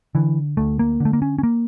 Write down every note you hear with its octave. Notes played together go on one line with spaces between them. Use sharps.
D3 E3
D2 A3
A#3
D3
A3
A#3
C#4
C#4
A#3